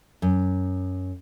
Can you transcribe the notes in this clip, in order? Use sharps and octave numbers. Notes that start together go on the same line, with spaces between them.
F#2